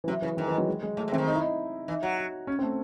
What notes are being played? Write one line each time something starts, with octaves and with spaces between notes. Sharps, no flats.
E3
C3 F#3
C#3 E3
G#2 D#3
E3
F#3
G#3
G#3
A2 A3
C3
E3 C4
D#3
D#4
E4
D#4
E3 D#4
F#3 F#4
F#4
C#4
C4
A3